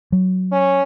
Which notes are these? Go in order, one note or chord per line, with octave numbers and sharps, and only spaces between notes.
F#3
C#4